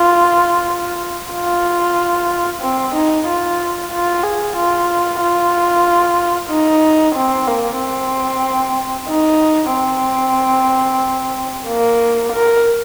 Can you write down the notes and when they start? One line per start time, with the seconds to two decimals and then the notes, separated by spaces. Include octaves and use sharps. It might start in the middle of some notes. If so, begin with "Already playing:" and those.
Already playing: F4
1.33 F4
2.62 C4
2.95 D#4
3.27 F4
3.91 F4
4.23 G#4
4.57 F4
5.21 F4
6.50 D#4
7.15 C4
7.47 A#3
7.79 C4
9.09 D#4
9.73 C4
11.68 A#3
12.33 A#4